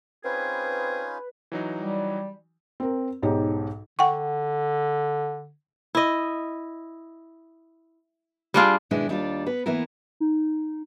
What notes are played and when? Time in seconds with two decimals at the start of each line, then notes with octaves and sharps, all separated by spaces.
0.24 C4 C#4 D#4 F4 G#4 B4
1.52 E3 F#3 D#4
1.79 G3
2.80 C4 A#4
3.22 B1 G#2 D#4 G4 C#5
3.99 D3 F#5 G5 C#6
5.95 E4 D#5
8.54 G3 D4 F4 G#4
8.91 B2 D#3 G#3 D4 E4
9.09 D#2 G3 D4 E4 F4 D5
9.46 B3 B4
9.66 E3 A#3 B3 E4 A#4
10.20 D#4